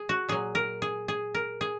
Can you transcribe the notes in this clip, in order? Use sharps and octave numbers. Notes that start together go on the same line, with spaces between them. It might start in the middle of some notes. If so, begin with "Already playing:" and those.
Already playing: G#4
F#4
A#2 F#3 G#4
A#4
G#4
G#4
A#4
G#4